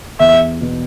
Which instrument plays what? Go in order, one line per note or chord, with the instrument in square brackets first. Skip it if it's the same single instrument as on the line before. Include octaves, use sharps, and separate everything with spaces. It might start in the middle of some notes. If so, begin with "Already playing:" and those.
[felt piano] E2 [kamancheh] E5
[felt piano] B2